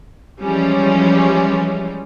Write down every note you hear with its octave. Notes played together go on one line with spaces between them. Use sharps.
E3 F3 G3 G#3 C#4